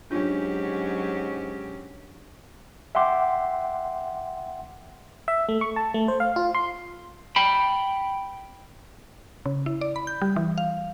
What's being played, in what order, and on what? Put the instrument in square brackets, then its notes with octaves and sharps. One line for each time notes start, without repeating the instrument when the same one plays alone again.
[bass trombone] G#2 [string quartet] F#3 [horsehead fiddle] C#4 G4 [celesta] D4 F4
[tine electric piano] E5 F#5 G5 C6 D6
[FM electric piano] E5
A3
C#6
A5
A3
C5
F5
F4
C6
[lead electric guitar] G5 B5
[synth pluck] C#3
E4
D5
B5
G6
G3
E3
F5